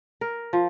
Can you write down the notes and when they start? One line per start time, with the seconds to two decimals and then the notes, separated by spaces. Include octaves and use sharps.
0.21 A#4
0.53 F3